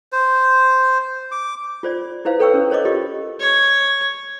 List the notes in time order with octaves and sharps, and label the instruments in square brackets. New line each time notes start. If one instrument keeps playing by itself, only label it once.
[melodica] C5
D6
[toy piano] F4 C5 D5
E4 B4 C5 F5
A4 B4 C#5 G5 C#6 E6
C#4
A#4 C5 C#5 D#5 D6
F4 G4 D#5
[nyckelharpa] C#5